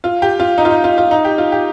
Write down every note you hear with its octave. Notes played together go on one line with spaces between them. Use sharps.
F4
G4
F4
D#4
F4
D#4
F4
F4
D#4
G4
F4
G4